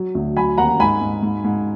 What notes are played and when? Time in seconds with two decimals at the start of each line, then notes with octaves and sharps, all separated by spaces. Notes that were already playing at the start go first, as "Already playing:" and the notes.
Already playing: F#3
0.15 D2
0.37 F#3 G#5 B5
0.57 D#2 F#5 A#5
0.79 G#2 G#5 B5
1.01 G#2
1.23 G#2
1.44 G#2